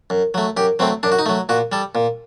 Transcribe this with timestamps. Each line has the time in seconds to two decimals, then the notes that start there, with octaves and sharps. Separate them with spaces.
0.10 F#2
0.34 F#3 A3
0.57 F#2 G4
0.79 F#3 A3 C4
1.03 F#2 D4
1.12 F#4
1.19 D#4
1.26 F#3 A3
1.49 A#2 F#4
1.72 G3 A4
1.95 A#2